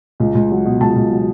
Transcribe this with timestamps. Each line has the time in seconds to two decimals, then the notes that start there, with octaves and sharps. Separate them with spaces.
0.20 C#2
0.35 C#2
0.51 F#3
0.65 B2
0.80 C#2 A5
0.96 C#2
1.11 F#3